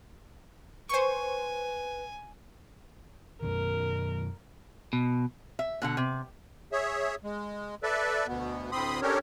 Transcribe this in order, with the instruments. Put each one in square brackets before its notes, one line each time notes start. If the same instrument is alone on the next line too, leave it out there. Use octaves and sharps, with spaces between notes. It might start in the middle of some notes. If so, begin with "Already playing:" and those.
[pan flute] B4 [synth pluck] C5 C#6 [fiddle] G#5
[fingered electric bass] F#2 B2 D#3 [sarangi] A#4
[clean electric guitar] B2
[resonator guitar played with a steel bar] E5
B2 D3 F#5
C3
[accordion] G#4 C#5 E5
G#3
A4 B4 D5 E5
D2 B2 B3
D2 A2 C4 B5 C6 D#6
C#4 D4 G4 A4 A#4 C#5